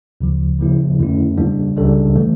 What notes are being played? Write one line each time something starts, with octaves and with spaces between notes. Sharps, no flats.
D2 C#3 F3
C#3 F3 A#3 E4
F2 D3 A3 C#4 E4
C#3 G3 A#3 D4
C#2 C#3 G3 D4 A4
E3 A3